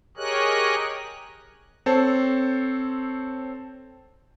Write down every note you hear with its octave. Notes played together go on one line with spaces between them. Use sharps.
G4 G#4 A#4 C#5 D#5 F#6
C4 A4 C5 C#5 A5